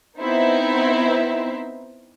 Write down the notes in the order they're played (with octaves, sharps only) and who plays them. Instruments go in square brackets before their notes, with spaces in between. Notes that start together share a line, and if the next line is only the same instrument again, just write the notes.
[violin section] B3 C4 D#4 E4 C5 E5